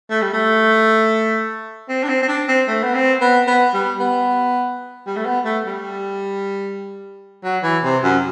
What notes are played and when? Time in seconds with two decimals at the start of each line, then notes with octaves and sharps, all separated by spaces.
0.10 A3
0.22 G3
0.33 A3
1.89 C4
2.03 D4
2.09 C4
2.23 C4
2.28 D4
2.48 C4
2.68 A3
2.83 B3
2.94 C4
3.21 B3
3.47 B3
3.74 G3
4.00 B3
5.07 G3
5.16 A3
5.26 B3
5.45 A3
5.66 G3
7.43 F#3
7.63 E3
7.84 C3
8.03 F#2